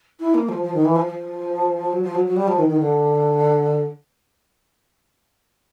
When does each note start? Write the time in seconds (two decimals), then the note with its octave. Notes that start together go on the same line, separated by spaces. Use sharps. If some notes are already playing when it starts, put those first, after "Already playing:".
0.19 E4
0.34 A#3
0.48 F3
0.62 F3
0.74 D#3
0.85 E3
0.95 F3
1.06 F3
1.92 F#3
2.03 F3
2.15 F#3
2.25 F#3
2.36 G3
2.47 F3
2.58 D#3
2.68 D#3
2.79 D3